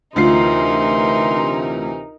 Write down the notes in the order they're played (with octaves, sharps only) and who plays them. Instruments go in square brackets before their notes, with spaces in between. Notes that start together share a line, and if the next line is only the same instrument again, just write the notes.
[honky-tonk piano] D2 F4 C7 [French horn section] C3 E3 [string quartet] D#4 A#4 [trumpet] C6